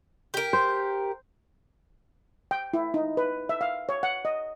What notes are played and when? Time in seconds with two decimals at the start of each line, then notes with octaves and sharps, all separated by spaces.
0.34 G4 A#4
0.53 C5
2.51 G5
2.73 E4
2.94 D#4
3.17 B4
3.49 E5
3.61 F5
3.89 C#5
4.03 F#5
4.25 D#5